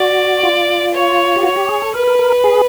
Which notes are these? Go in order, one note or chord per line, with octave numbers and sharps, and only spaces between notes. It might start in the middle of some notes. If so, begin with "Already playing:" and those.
Already playing: F#4 D5
F4
C#5
G4
F#4 C#5
G4
G#4
A4
A#4 B4
A#4
A#4
G#4